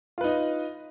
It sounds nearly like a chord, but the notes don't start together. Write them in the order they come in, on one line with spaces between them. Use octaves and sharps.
F4 B4 D#4 D#5